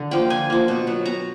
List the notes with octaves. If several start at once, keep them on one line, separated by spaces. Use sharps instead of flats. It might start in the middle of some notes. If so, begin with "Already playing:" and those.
Already playing: D3
F3 A#3 G5
D3 G#5
F3 A#3
B2
F#3 B3
B2 A#5